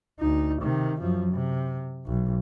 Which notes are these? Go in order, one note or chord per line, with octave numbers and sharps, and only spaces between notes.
D2 D#4
C3 D#3
F#2 F3
C3
B1